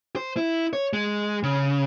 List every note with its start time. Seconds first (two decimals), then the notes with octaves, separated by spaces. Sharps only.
0.16 C5
0.37 E4
0.73 C#5
0.93 G#3
1.43 C#3